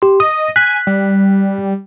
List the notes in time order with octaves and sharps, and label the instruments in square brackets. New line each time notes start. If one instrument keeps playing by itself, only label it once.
[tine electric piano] G4 C6
[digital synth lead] D#5 [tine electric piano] D#6
[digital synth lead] G#5 [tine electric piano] F#6 B6
[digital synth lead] G3